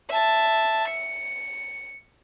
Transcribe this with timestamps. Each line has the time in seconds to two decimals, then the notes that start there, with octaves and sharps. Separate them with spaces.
0.10 E5 A5
0.88 C#7